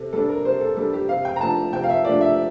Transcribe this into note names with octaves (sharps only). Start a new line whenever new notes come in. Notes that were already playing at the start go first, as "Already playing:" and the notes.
Already playing: C3 A4
G3 D4 A4
A#4
C3 C5
A4
G3 D4 A4
G4
C3 F5
G5
A#5
F3 A3 D4 A5
C3 G5
F5
E5
F3 A3 D4 D5
E5